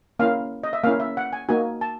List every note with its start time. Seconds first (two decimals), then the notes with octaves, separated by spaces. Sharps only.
0.19 A#3 C#4 E4 F5
0.64 D#5
0.73 E5
0.84 A#3 C#4 E4 F5
1.00 E5
1.17 F#5
1.33 G#5
1.49 A#3 D#4 F#4 G#5
1.81 A5